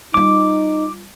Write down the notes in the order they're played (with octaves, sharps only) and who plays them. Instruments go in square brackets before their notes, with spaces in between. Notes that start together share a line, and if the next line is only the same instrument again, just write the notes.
[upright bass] G3 F4 [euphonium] D#4 [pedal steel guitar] D6